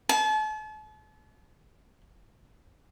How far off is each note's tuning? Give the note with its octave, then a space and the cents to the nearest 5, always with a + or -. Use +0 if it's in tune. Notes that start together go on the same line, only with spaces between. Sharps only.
A5 -40